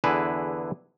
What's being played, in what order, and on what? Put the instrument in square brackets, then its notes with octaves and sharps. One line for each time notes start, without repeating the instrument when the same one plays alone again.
[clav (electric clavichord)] E2 D3 E4 G#4 B4